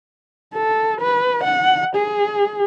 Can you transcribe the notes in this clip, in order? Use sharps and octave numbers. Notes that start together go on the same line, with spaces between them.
A4
B4
F#5
G#4